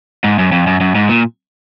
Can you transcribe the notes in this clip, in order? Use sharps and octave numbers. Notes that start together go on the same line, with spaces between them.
G#2
F#2
F2
F#2
F#2
G#2
A#2